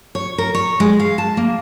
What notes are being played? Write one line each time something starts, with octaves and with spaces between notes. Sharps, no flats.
C#5
A#4
C#5
G#3
F5
A5
A#3